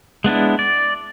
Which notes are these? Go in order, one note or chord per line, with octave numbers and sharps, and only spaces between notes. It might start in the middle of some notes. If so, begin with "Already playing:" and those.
G#3 B3 D4 E4
D5